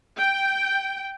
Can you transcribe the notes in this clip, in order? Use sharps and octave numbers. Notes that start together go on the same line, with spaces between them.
G5